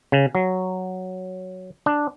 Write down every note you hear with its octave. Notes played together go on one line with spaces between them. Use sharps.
C#3
F#3
D4